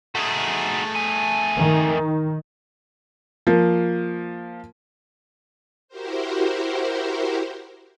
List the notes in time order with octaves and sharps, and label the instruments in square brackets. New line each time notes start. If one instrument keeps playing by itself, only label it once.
[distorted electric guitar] A3 G#4 [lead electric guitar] D#4 F#4
[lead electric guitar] F2 G#5
[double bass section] D#3
[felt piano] F3 A#3
[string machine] E4 F#4 G4 A#4 C5